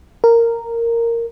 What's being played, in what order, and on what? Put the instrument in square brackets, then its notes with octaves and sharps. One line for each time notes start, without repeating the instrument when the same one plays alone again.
[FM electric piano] A#4